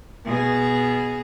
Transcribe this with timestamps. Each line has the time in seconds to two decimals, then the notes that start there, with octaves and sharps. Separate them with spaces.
0.25 B2 G#4